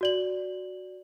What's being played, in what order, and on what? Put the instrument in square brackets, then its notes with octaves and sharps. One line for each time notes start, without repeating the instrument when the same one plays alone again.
[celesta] F#4 D5 F#7